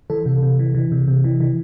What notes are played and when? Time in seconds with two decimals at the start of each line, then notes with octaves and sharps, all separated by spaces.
0.10 E3 A4
0.26 C3
0.43 C3
0.59 E3
0.75 E3
0.92 C3
1.08 C3
1.24 E3
1.40 E3